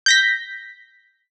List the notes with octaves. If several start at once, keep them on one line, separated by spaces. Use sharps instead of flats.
G6 A#6 B6